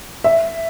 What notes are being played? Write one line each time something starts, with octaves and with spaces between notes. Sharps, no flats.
E5